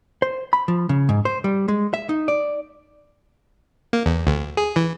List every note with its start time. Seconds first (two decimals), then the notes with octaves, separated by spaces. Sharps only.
0.22 C5
0.53 B5
0.68 F3
0.89 C#3
1.09 G#2
1.25 C5
1.44 G3
1.68 G#3
1.94 E5
2.09 D#4
2.28 D5
3.93 A#3
4.06 E2
4.27 D2
4.57 G#4
4.76 E3